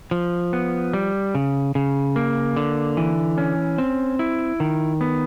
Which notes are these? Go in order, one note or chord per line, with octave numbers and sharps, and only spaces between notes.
F3
B3
G3
C#3
C#3
A#3
D3
E3
C#4
C4
E4
D#3
B3